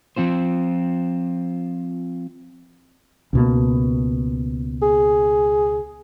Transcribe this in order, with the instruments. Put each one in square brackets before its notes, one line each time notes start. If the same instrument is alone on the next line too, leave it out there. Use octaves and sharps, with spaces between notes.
[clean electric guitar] F3 C4 F4 C5
[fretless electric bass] C#2 B2 A#3
[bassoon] G#4